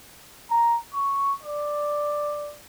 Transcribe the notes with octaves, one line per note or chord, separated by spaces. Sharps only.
A#5
C#6
D5